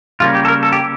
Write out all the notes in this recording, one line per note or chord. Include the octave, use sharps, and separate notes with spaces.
C#3 G3 A#3 C#4 F4
G4
A4
A#4
A4
G4